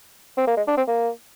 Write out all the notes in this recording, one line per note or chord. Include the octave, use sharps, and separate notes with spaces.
C4
A#3
G#3
D4
C4
A#3